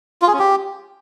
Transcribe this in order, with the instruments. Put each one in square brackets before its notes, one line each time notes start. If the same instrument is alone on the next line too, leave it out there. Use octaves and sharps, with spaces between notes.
[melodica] F4
G#4
C#4
G4